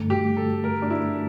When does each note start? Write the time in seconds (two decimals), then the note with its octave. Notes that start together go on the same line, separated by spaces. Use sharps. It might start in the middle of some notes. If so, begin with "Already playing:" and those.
Already playing: G2 D3 A3
0.10 G4
0.37 A4
0.64 A#4
0.82 D4
0.90 E4